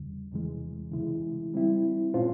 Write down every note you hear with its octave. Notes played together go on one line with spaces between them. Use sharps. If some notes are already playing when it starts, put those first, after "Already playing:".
Already playing: E2 C#3 G3
E2 C3 E3 G#3
C#3 E3 G#3 E4
G3 C4 E4
A#2 G#3 C#4 F4 C5